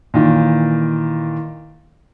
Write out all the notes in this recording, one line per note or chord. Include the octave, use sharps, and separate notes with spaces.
A#2 D#3 E3